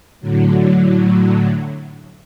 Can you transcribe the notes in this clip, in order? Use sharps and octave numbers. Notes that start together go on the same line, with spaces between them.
A2 D3 F#3